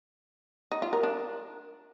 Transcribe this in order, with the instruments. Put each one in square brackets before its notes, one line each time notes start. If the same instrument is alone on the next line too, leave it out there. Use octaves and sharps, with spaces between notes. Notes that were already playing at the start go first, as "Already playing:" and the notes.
[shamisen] D#4
F4
A#4
D4